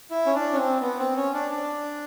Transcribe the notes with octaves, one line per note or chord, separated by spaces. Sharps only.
E4
C#4
D4
C#4
C4
B3
C4
C#4
D4
D4